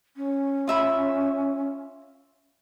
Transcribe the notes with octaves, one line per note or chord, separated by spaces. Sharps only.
C#4
F4 E5 B5